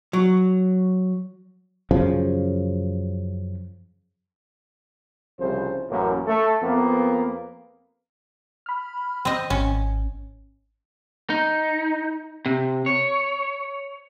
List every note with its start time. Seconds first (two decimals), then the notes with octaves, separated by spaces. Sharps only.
0.13 F#3
1.91 F#2 C#3 F3
5.40 C2 C#3 F3 C5
5.90 A1 F#2 A#3
6.27 A3 A4
6.62 F2 A#3 B3
8.66 B5 F6
9.25 C4 D#5
9.50 G#1 C#4
11.30 D#4
12.46 C3
12.86 C#5